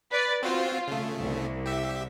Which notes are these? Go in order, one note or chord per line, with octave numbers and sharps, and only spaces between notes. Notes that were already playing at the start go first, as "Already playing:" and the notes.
B4 D5
C4 F4 F#4 C5
C#3 A3
C2
G4 E5